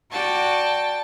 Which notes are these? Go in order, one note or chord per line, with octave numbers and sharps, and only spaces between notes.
F#4 D5 G5 A5